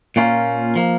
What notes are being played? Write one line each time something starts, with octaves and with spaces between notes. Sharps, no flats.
A#2 A#3 C#4 F4
F3 A#3